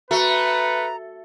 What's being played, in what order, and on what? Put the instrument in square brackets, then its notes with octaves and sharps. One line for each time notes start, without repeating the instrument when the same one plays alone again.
[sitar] A3 [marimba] F#4 [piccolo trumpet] B4 [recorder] A#5